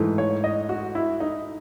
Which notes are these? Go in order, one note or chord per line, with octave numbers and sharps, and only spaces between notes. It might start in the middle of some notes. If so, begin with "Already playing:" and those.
Already playing: G#2 E3 A3
C#5
D#5
F#4
E4
D#4